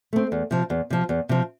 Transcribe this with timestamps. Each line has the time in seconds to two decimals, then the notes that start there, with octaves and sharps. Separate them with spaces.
0.13 A3 C4
0.32 E2
0.51 C3 F3
0.70 E2
0.90 C3 F3
1.09 E2
1.29 C3 F3